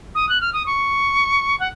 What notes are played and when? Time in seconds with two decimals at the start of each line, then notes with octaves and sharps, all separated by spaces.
0.15 D#6
0.29 F#6
0.41 F6
0.53 D#6
0.66 C#6
1.60 F#5